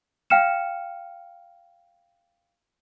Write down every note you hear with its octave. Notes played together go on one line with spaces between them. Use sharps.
F5 G5 F6 C#7 E7